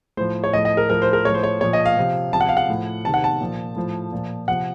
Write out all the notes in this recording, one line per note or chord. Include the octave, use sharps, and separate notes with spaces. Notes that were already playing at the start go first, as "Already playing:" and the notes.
A2 F3 C5
C#5
A2 F3 D#5
D#5
A#4
A2 F3 A#4
C5
A#4
A2 F3 C#5
C5
C#5
A#2 F3 C#5
D#5
F5
C3 F3
C3 F3 A5
F#5
F5
F#5
A2 F3
C3 D#3 A5
F#5
A5
A#2 F3
A2 F3
A#2 F3
C3 F3 F#5